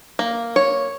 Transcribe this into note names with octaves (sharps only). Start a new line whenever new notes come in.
A#3
C#5